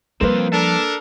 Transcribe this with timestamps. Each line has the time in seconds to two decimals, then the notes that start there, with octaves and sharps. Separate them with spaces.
0.21 F3 G3 A#3 C4 F4 B4
0.53 D4 A4 A#4 A5